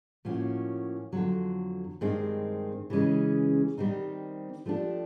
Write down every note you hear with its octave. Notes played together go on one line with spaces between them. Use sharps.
A2 F3 A#3 C#4 F#4
F2 D3 F#3
G2 D#3 G#3 C4
C#3 E3 G#3 C#4
D#3 G3 C4 D#4
F3 A3 D4 G4